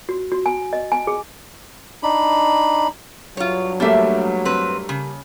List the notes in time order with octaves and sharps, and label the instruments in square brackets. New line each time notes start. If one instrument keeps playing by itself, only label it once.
[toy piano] F#4
F#4
G#5
D#5
G#5
G#4
[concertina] D4 D#4 B5
[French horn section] G2 F#3 [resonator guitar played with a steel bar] F4 C#5
[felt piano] G3 A3 A#3 [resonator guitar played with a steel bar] D4 E5
[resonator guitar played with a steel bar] C4 B4
C#3